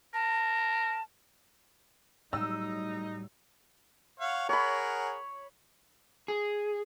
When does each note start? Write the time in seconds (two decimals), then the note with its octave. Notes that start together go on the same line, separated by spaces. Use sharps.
0.14 A#4 A5
2.33 A2 F#3 G3 D#4 E6
4.20 C#5 F5 F#5
4.49 G#4 A#4 C#5 F#5 B5
6.28 G#4